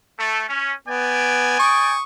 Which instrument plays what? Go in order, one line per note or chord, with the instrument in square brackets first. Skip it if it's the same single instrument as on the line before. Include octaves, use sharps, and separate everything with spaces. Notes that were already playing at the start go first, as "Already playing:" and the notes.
[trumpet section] A3
C#4
[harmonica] B3 [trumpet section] D5 G5 G#5
[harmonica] C#6 D#6